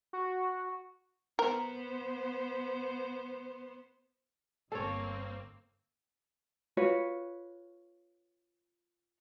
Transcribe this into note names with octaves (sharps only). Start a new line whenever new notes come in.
F#4
B3 A#4 C5
G1 A#3 C4 A4 C#5
F4 F#4 B4 C#5